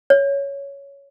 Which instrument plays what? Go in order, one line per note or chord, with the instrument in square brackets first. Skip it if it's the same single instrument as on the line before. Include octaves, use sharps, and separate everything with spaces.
[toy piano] C#5